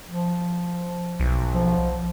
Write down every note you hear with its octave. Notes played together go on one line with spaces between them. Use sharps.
F3
B1
F3